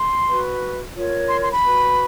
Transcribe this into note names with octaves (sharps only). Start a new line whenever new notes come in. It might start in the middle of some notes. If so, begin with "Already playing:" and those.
Already playing: C6
F#4 B4
F4 A#4 C#5
C6
C6
B5
F#4 B4